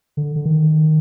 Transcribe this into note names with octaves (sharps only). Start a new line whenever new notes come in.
D3
D3
D#3